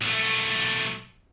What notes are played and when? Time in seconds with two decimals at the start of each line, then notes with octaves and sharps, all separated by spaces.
0.01 B1 A3